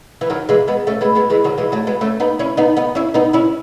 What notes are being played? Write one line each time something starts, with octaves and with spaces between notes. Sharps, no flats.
E3
D#3 F#3
E3 G#3
G#3 B3
A3 C#4
G#3 B3
G#3 B3
E3 G#3
D#3 F#3
E3 G#3
F#3 A3
G#3 B3
A3 C#4
B3 D#4
C#4 E4
B3 D#4
B3 D#4
C#4 E4
B3 D#4
C#4 E4